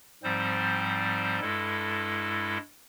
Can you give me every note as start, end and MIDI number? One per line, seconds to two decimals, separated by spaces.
0.23 1.40 44
0.23 1.40 53
0.23 1.40 55
0.23 1.40 60
0.23 1.40 72
1.41 2.58 43
1.41 2.58 56
1.41 2.58 64
1.41 2.58 69